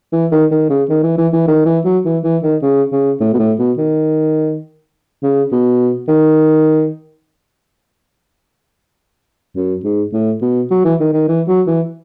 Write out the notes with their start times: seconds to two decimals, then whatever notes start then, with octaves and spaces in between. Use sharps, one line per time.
0.12 E3
0.32 D#3
0.51 D#3
0.69 C#3
0.89 D#3
1.03 E3
1.18 E3
1.33 E3
1.47 D#3
1.65 E3
1.85 F#3
2.05 E3
2.24 E3
2.43 D#3
2.62 C#3
2.92 C#3
3.20 A2
3.33 B2
3.39 A2
3.58 B2
3.78 D#3
5.23 C#3
5.51 B2
6.08 D#3
9.55 F#2
9.84 G#2
10.12 A2
10.41 B2
10.70 F#3
10.85 E3
11.00 D#3
11.13 D#3
11.28 E3
11.47 F#3
11.67 E3